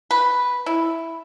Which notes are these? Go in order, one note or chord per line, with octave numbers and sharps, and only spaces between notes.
B4
E4